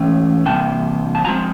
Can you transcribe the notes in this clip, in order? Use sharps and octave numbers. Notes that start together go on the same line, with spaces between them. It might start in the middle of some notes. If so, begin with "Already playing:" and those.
Already playing: G#2 E3 A3 C#4 G5
C3 E3 G3 A#3 G5 A5
A5
A2 F3 G#3 C4 G#5 A#5